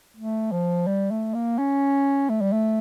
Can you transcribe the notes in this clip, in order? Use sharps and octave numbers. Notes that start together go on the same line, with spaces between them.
A3
F3
G3
A3
A#3
C#4
A3
G3
A3